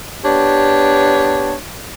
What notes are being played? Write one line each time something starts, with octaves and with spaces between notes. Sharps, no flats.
B3 D4 G4 C#5